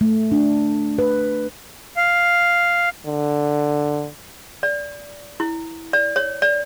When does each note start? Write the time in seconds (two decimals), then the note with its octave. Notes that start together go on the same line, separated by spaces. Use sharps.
0.01 A3
0.32 D4
0.99 B4
1.97 F5
3.06 D3
4.63 D5
5.40 E4
5.93 D5
6.16 C#5
6.42 D5